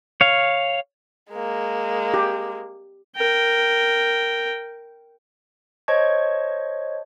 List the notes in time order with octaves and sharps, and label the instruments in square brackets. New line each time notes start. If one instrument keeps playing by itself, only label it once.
[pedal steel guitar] C#5 F5
[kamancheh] G#3 A#3
[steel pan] G4
[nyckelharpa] A#4 G5
[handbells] C5 C#5 D#5 A5 C#6 G#6